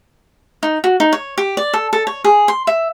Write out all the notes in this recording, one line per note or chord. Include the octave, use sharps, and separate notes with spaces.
D#4
F#4
D#4
C#5
G4
D5
A4
A4
C#5
G#4
C6
E5